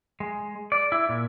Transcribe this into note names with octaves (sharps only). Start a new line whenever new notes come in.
G#3
D5
E4
A#2